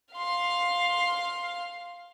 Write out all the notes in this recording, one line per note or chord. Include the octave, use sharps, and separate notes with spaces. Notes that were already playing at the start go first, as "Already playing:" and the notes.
F5 C6